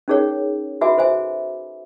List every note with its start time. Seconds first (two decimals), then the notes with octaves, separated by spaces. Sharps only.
0.08 C#4 D#4 G#4 A#4 C#5
0.81 F#4 B4 E5 G#5 B5 D6
0.98 A4 C5 E5 G#5